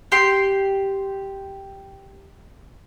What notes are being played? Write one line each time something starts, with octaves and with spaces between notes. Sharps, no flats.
G4 G5 C6